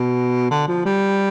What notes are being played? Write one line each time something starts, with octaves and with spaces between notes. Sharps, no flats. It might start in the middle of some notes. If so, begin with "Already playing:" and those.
Already playing: B2
D3
F3
G3